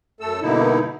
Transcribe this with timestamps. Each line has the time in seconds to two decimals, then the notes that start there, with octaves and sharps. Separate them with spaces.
0.20 F#2 A3 A4 E6
0.42 G2 B2 D3 A#3 D#4 E4